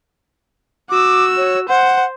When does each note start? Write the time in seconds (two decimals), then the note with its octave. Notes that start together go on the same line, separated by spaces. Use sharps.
0.90 F#4 D6 E6
1.37 C#5
1.68 C5 F#5